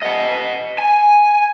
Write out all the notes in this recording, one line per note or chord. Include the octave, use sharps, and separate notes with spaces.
D#5 F#5
G#5